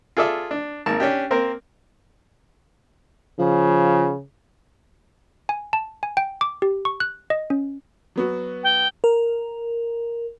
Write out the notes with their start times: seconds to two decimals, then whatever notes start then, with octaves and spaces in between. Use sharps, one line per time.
0.17 F4 G#4 A4 D5 E5
0.51 D4
0.86 G#1 A#3 A5
1.00 C#4 D4 G4
1.30 A#3 C4 A#4 C5
3.39 C#3 F3
5.49 G#5
5.73 A5
6.03 G#5
6.17 G5
6.41 D6
6.62 G4
6.85 C#6
7.00 F#6
7.30 D#5
7.50 C#4
8.16 F#3 B3 F#4
8.63 G5
9.04 A#4